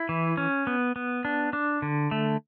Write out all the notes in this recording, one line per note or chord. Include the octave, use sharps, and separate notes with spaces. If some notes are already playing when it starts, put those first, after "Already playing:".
Already playing: E4
E3
C#4
B3
B3
D4
D4
D3
A3